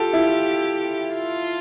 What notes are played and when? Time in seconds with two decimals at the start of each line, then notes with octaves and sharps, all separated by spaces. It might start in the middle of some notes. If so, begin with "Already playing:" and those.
Already playing: F4 G4 A4
0.13 E4
1.15 F4